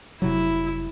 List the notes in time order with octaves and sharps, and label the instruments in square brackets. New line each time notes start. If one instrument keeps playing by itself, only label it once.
[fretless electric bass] F1 C3 F#3 [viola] E4